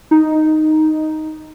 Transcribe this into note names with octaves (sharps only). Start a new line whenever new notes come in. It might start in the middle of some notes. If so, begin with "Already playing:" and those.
D#4